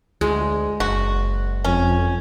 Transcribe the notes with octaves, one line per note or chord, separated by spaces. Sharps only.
D2 G#3
F#1 F#4
F2 C#4